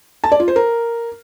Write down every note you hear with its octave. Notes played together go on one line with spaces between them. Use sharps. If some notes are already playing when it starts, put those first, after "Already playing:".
A5
D5
F4
C5
A#4